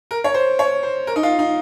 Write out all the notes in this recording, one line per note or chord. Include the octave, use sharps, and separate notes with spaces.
A#4
C#5
C5
C#5
C5
A#4
D#4
F4
D#4